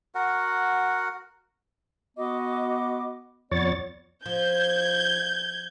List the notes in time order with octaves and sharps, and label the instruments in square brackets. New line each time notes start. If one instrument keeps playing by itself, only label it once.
[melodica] F#4 A#4 F#5
[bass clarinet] B3 [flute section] F#4 D#5 D6
[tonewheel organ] F2 C#5 A6 [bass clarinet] B3 [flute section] D5
[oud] F3 [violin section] G6 G#6